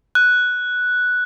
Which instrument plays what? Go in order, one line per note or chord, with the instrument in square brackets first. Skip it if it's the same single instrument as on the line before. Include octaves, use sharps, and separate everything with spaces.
[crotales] F#6